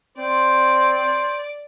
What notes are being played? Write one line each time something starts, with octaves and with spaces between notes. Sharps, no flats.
C4 C5 D5